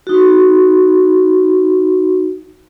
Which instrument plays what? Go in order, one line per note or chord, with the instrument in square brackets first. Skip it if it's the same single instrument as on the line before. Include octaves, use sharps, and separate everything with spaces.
[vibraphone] D#4 F#4